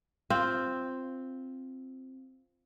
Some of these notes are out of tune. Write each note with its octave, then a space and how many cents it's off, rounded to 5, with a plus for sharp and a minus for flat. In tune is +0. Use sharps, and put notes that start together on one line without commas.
C4 +0 F4 +0